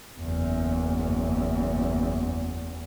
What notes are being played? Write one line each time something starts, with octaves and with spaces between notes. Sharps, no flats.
F#1 E2